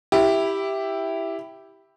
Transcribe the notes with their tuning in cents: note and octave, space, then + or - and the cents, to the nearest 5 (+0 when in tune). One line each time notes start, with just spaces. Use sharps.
E4 +0 G4 +0